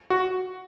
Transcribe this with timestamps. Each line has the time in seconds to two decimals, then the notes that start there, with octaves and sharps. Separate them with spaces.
0.10 F#4